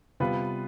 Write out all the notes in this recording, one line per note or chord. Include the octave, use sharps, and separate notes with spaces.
C3 G3 B3 F4 B4